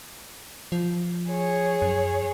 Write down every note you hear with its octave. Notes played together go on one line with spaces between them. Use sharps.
F3
G#4 C#5
F#2